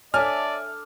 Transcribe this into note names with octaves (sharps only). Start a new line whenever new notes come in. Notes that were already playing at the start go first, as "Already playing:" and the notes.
D4 A4 C#5 D5 E5 G#5 F6